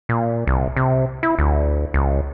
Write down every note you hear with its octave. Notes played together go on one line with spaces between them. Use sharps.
A#2
C2
C3
E4
D2
C#2